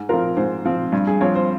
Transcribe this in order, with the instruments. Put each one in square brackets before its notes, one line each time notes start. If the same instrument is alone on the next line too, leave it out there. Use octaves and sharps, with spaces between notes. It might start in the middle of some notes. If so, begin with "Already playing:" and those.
Already playing: [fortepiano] G#2
[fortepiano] F3 C4 F4 [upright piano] A#4
[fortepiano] G#2 [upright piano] C5
[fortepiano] F3 C4 F4
G2
[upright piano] G#4
[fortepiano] F3 C4 [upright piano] C#5
[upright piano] C5